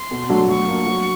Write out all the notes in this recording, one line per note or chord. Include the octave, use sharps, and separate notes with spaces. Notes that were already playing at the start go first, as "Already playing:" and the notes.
Already playing: C6
B2
F#3 A3 D4
F#3 C#6
A#3 D4
F#3